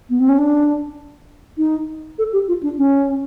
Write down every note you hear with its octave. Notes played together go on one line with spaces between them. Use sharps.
B3
C4
C#4
D4
D#4
A4
G4
F4
D4
C#4